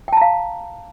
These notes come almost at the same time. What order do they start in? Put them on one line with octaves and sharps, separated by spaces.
G5 A5 A#5 F5